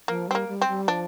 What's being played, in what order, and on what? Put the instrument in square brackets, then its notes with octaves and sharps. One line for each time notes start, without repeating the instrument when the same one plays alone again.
[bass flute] F3 [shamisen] A#3
[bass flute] G3 [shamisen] C4
[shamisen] A#3
[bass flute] G3
[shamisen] C4
[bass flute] G3
[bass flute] F3 [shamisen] D4